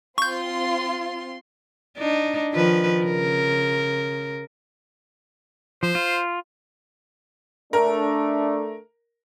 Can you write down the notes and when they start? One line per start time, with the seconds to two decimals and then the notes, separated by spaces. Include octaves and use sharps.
0.18 C4 F4 C6 C#6 G6
1.97 D4 D#4
2.52 D#3 F3 B4
3.02 C#3 A#4
5.83 F3 C5
5.95 F4
7.73 A3 D4 A#4